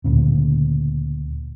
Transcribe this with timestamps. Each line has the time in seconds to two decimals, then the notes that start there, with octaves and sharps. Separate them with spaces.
0.04 D2 A#2 C#3